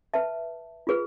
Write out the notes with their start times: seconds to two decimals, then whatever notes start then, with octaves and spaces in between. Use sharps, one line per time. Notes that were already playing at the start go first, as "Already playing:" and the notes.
0.14 B4 E5 A5
0.87 F4 G#4 B4